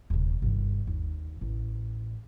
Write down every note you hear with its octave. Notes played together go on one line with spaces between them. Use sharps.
D#1 C3
G1 D#3
D#2
A1